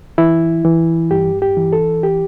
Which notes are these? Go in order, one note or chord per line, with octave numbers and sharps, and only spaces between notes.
E3 E4
E3
G2 G4
G4
E3
A4
G4